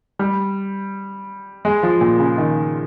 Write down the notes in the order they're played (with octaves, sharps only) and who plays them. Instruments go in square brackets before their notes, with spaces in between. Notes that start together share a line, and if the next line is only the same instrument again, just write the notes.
[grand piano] G3
G#3
F3
A#2
C#3
D#3